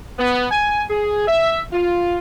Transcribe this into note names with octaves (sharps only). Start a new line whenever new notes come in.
B3
G#5
G#4
E5
F4